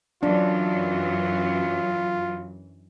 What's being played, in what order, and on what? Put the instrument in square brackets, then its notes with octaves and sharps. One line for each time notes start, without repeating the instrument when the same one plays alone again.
[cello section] F#2 E3 F#3 [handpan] D4 [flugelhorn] F4